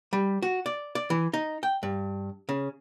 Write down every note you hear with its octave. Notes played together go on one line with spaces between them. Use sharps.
G3
F#4
D5
D5
E3
D#4
G5
G2
C#3